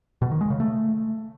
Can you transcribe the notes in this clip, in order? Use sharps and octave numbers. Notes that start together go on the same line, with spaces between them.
B2
D#3
G#3
C#3
A3